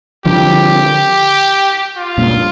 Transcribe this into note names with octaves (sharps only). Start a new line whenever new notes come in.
D3 F3 G4
F4
G2 A#2